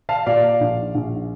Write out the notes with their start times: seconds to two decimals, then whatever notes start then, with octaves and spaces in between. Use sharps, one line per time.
0.09 F5 A5
0.26 A#2 D5 F5
0.60 A#1
0.95 A#1